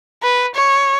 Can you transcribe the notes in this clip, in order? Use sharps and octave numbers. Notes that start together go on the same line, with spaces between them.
B4
C#5